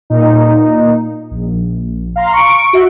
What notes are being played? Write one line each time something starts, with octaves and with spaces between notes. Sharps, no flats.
A#2 D#4
A#1
F5 A#5 C6
C#6 C#7 D7
F#4 E5